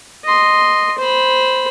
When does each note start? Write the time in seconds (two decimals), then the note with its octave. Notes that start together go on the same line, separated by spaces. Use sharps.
0.25 D#5 C6
0.98 C5 B5